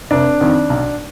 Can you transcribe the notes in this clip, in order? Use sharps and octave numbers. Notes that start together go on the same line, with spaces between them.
F1 D4
F2 D#3
B1